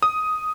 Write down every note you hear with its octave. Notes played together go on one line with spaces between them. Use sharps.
D#6